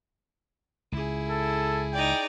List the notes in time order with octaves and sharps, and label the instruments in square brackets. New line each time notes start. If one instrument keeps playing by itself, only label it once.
[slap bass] C#2 [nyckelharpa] E4 G#4
[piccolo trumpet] A4
[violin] D#4 D5 [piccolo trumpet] G5